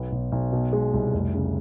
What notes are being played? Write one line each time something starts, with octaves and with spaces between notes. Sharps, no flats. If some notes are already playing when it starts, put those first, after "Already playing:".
Already playing: B1 B3
B1
B1
B2
G#3
C2
F1
C#3